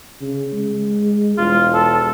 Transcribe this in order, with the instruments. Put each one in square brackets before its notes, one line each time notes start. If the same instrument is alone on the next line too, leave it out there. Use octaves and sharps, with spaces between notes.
[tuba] C#3
G#3
[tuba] E1 [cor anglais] F4
[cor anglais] A4